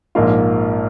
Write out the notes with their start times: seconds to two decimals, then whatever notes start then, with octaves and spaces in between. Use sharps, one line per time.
0.15 A#1 G#2 F3 A#3 F4